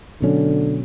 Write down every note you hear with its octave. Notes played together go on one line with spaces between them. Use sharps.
B2 D3 F#3 C#4